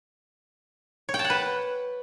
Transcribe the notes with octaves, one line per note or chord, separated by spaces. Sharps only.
C#5
G5
A5
F#5
B4